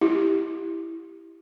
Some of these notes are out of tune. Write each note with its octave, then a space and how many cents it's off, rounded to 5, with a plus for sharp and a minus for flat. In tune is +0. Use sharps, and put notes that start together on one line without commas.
E4 +0 G4 +0